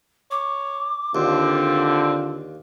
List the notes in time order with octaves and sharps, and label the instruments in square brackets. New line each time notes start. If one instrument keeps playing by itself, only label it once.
[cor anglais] C#5 [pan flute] D6
[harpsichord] D#2 [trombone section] D3 F4 [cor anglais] C4